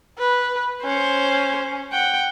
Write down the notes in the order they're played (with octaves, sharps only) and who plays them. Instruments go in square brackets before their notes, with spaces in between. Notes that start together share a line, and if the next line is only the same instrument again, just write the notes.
[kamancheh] B4
[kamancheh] C#4 [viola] C5
[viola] F#5 G5